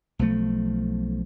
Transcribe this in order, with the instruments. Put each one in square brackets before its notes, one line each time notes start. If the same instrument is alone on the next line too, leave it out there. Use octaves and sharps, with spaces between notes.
[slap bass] B1 F3 A3